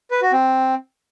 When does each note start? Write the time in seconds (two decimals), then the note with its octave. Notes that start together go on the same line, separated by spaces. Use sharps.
0.11 B4
0.22 F#4
0.33 C4